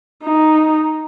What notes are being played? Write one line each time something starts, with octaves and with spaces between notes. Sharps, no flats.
D#4